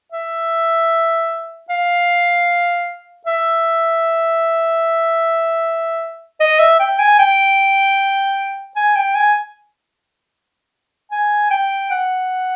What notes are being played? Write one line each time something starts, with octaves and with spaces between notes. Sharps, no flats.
E5
F5
E5
D#5
E5
G5
G#5
G5
G#5
G5
G#5
G#5
G5
F#5